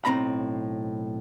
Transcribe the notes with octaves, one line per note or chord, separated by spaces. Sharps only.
B1 A2 C4 A#5 B5